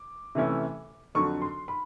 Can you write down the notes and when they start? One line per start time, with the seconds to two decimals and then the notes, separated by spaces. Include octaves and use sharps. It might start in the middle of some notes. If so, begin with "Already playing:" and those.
Already playing: D6
0.35 C3 E3 A3 C#4 E4
1.15 F2 D3 F#3 C#6
1.42 C6
1.68 B5